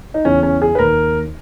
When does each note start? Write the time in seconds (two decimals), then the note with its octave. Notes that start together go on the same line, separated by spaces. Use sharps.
0.14 D#4
0.25 E2 C#3 E3 C#4
0.43 C#4
0.62 G#4
0.75 B4
0.79 D#2 A#4
0.84 D#3